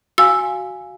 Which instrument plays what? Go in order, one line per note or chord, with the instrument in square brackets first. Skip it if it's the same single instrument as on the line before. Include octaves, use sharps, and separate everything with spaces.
[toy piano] F#4 F5 G#5 [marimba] E6